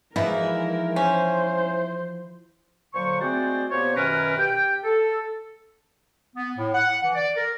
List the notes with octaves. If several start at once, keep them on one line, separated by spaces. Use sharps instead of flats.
B2 E3 F3 G#3 D#4 E4 A#4
C#4 C5
A#2 D3 F#3 C5 C#6
G#3 A3 C4 F#4 C5 D5
A#2 B3 G4 C5 C#5
F#2 B2 D#3 C#4 A#4 B4
G4 G5
A4
B3
A2
F#5
E3
D5
A#4